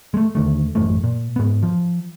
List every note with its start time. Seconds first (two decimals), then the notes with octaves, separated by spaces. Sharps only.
0.14 G#3 A3
0.35 D#2 D3 A3
0.75 A1 F#2 A#2 A3
1.04 A#2
1.36 G#2 B3
1.63 F3